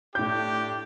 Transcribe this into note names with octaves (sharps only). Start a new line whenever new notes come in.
A2 D4 G4 G6